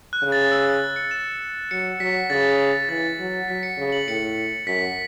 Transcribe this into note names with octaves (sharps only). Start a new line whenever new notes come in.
F#6
C#3
A6
E6
A6
C#7
E7
F#3 C#7
F#3 B6
C#3 A6
E3 A6
F#3
F#3 B6
C#7
C#3
F#7
A2 C#7
F#2 B6